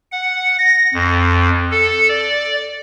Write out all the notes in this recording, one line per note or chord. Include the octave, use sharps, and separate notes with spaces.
F#5
A#6
F2
A4
D5